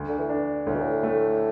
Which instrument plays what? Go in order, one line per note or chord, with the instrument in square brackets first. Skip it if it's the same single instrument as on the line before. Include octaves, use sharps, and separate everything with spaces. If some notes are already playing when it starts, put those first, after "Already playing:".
Already playing: [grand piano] D2
[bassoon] D3
E3
[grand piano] D4
[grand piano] D2 [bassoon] A2
[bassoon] B2
A2
[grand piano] A3